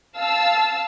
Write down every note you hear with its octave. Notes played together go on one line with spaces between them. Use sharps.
F5 A5 E6